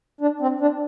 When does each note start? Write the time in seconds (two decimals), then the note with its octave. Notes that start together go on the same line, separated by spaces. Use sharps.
0.21 D4
0.41 C4
0.61 D4